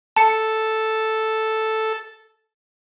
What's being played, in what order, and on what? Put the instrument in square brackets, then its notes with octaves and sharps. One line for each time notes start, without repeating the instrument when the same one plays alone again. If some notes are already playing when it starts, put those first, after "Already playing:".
[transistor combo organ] A4 [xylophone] A5 C#7